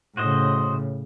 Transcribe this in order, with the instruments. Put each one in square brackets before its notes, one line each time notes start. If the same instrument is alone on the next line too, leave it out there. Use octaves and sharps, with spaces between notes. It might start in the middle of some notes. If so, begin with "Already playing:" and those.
[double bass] A2 C#3 [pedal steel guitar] F#4 C5 D#5